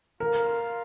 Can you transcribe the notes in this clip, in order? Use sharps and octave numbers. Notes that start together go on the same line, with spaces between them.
F4 A#4 C5 F5